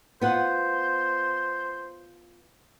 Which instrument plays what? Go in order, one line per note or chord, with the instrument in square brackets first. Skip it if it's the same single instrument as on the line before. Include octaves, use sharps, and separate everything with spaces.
[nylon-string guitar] B3 F4 F#5 [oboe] C5